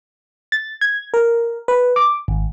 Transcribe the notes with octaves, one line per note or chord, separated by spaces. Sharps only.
A6
G#6
A#4
B4
D6
G#1